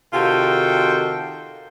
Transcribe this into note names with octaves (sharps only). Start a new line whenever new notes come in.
C3 D#3 F4 F#4 A4 G5